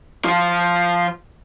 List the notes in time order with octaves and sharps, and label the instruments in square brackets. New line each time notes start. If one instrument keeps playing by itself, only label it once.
[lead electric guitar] F3 F4